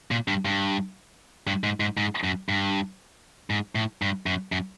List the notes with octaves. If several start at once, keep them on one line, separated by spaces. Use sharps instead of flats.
A#2
G2
G2
G2
G#2
G#2
G#2
F#2
G2
G#2
A2
G2
F#2
F#2